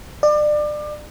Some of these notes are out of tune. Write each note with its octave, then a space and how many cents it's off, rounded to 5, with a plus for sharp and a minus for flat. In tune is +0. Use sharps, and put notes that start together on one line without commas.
D5 +30